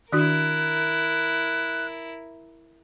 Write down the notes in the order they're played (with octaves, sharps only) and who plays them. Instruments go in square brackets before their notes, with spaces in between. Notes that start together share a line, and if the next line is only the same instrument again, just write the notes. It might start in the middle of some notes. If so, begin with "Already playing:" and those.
[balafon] D#3 D4 F#4 [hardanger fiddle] E4 A#4 [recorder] F#6